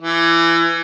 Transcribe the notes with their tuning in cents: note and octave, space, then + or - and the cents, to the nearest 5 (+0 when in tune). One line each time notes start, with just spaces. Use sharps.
E3 +25